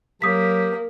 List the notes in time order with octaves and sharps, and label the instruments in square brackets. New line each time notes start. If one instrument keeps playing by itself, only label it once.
[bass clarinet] F#3 [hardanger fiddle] A#3 [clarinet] G4 [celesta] D#6 B6